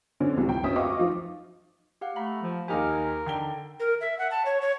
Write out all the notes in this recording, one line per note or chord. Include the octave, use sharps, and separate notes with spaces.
D3 C4 C#4
C#2 A2 C3 E3 G3
G5
F1 D2 C#4 E5 G5 D#6
D#5 F5 C#6 D6
F3 D#4 F4
G4 F5 F#5
A3 F5 A#5 B5
F3
D#2 D#4 G4 A#4 G#5 F6
D3 D#4 G5 G7
A#4
E5
F#5
A5
C#5
C#5